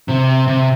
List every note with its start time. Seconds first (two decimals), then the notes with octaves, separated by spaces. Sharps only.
0.08 C3
0.48 C3